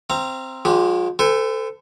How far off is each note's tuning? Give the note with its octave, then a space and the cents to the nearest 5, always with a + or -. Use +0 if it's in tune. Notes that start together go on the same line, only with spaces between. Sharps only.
C4 +0 F5 -35 A#5 -10
F3 +40 G#3 +0 G4 -20
A4 +10 C5 -45 G#5 -45